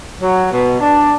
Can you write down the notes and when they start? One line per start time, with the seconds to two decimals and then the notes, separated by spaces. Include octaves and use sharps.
0.22 F#3
0.51 B2
0.80 D4